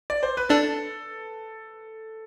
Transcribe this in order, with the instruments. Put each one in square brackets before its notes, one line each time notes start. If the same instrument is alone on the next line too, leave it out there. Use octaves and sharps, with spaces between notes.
[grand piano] D5
C5
B4
[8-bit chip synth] D4 [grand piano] A4